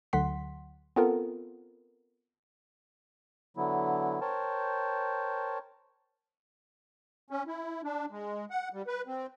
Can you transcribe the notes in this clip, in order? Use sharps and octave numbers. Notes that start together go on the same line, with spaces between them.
D2 D3 F#3 F#5 C6 B6
B3 C4 F4 A4 A#4
D3 F#3 B3 E4
A#4 C5 C#5 G5 A5
C#4
E4
D4
G#3
F#5
G3
B4
C4